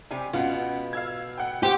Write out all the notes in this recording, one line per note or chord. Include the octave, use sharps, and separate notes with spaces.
C3 G3 G#5
C#2 B2 F4 F#5
F5 E6 G#6
F#5 G5
C4 G4